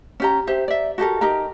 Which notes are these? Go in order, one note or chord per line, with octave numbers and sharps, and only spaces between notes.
C#4 G4 A#5
G4 C5 E5
D5 E5
F#4 G4 A4 A#4
D#4 G4 A#4 A#5